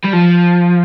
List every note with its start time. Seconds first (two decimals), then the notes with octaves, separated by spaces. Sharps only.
0.05 G3
0.13 F3